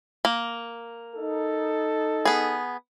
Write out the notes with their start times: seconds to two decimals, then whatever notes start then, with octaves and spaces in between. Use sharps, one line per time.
0.25 A#3
1.16 D#4 A4
2.25 B3 G#4